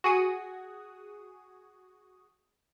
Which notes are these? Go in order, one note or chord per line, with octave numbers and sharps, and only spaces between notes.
F#4 G#4 D#6